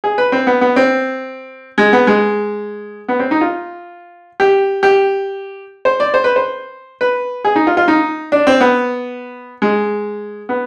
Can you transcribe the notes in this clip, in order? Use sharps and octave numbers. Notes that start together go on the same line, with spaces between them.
G#4
B4
C4
B3
B3
C4
G#3
B3
G#3
B3
C4
D#4
F4
G4
G4
C5
D5
C5
B4
C5
B4
G#4
D#4
F4
F4
D#4
D4
C4
B3
G#3
B3